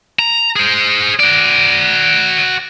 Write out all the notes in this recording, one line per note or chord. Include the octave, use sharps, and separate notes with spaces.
A#5
G#4 C5
F#4 D5